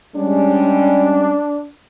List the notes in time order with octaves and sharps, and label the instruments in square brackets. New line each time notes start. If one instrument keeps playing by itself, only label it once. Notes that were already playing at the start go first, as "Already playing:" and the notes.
[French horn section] G3 G#3 C#4 [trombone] D4